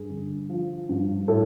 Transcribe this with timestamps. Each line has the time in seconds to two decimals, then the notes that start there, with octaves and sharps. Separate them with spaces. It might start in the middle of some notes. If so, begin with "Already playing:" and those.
Already playing: G2 G#4
0.10 D3
0.49 F3
0.89 G2
1.28 A2 A4